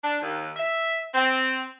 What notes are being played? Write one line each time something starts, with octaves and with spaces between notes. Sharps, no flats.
D4
D#2
E5
C4